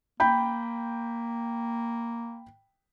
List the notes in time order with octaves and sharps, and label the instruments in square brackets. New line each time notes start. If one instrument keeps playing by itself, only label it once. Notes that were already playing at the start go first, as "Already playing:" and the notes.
[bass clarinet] A#3 [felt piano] G5 B5 G6